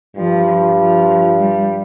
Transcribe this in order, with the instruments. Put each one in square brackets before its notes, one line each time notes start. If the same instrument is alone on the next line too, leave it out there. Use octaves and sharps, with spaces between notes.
[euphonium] G2 [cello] F3
[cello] F3
G3